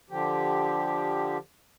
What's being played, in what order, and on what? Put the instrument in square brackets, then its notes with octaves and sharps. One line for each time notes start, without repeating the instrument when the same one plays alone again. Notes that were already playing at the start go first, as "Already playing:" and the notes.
[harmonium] D3 F3 G4